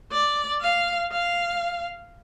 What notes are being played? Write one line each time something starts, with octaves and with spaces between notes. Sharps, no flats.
D5
F5
F5